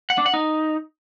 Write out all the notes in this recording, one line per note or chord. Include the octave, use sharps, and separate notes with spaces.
F#5
D4
F#5
D#4